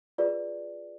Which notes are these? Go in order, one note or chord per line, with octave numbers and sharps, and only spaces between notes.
F4 G#4 B4 D5